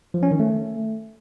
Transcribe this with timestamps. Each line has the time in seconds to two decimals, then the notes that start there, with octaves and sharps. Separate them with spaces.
0.14 F3
0.23 C#4
0.31 D#3
0.40 A3